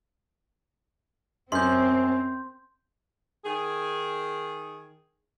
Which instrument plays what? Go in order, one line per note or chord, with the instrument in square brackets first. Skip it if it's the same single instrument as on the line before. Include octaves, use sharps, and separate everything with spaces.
[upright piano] F#2 [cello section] C4 [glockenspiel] C6 G6
[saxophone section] D#3 G#4